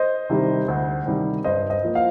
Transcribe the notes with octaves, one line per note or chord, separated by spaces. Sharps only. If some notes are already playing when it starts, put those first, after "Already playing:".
Already playing: C5 D#5
C3 D#3 G3
D2
C3 D#3 G3
G2 C5 D#5
C5 D#5
F3 A#3
F5